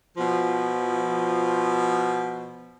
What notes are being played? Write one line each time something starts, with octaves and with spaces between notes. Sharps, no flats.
B2 F3